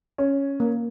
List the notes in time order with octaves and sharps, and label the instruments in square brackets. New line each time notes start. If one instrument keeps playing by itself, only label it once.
[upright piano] C#4
[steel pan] A#3